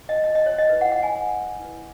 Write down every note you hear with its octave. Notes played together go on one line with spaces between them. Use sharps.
D#5
D#5
D#5
C#5
D#5
E4 B4
F#5
F#5
G#5
E4 B4